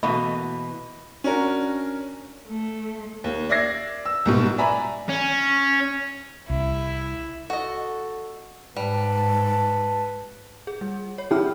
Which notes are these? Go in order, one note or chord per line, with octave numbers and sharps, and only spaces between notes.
B2 E3 A3 A#3 F#4 D#5 B5
C#4 D4 F#4 A#4
A3
D#2
D5 E5 G#6 A#6 C7
E6
C2 G#2 B2
D5 E5 G#5 A#5 B5
C#4
C2 E4
F#4 A4 D#5
G#2 G3 B4 A5
G#4
G3
C#5
E4 G4 G#4 F6